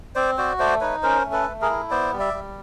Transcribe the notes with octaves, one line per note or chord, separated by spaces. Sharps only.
C4 C5 D5
F#4 C5 D5
A3 C5 D5
D#4 B4 C#5
C#4 A#4 C5
A3
A4 B4
A3
G#4 A#4
E4
B3 C5 D5
G3
D5 E5
G3